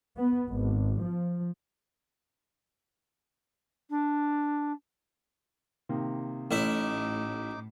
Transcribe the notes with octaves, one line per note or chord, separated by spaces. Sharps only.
B3
G#1
F3
D4
C3 D#3 A#3
A1 A2 D#4 E4 C#5 E5 D6